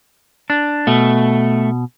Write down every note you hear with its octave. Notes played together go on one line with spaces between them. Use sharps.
D4
B2 A3